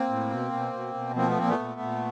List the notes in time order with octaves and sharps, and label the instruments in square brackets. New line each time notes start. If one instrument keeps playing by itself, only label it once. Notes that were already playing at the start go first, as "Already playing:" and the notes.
Already playing: [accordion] A#3 C4
A2
B2
B2
B2
B2
F3 A#3 C4
A3 B3
A#2 A#3 C4
A3 B3
A#2
A#2